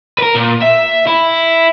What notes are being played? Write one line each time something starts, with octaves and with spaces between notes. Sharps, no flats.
A#4 B4
A#2
E5
E4